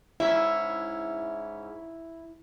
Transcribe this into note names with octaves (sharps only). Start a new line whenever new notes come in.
G#2 C#4 E4 E5